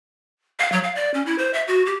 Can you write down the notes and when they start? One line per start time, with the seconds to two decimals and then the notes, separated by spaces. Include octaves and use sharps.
0.60 F5
0.72 F#3
0.84 F5
0.96 D5
1.14 C#4
1.26 E4
1.38 C5
1.54 E5
1.68 F#4
1.86 G4